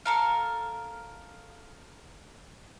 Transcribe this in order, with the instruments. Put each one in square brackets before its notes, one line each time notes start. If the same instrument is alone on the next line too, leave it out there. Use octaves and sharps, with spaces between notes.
[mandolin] A4 A#4 F5